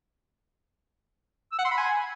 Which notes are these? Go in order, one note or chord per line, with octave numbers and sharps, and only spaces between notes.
E6
F#5
C6
B5
G#5